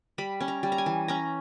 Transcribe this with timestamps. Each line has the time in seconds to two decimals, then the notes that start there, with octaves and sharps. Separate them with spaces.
0.18 G3 B5
0.40 C#4
0.48 A#5
0.63 G3
0.72 A#5
0.78 G#5
0.86 E3
1.08 C#4 A#5